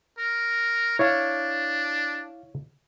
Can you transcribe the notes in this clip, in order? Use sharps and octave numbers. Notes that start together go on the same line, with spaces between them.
A#4
D4 E4 C#5 F5